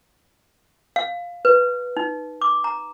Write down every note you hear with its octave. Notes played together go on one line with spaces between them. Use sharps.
F5
B4
D#4
D6
A#5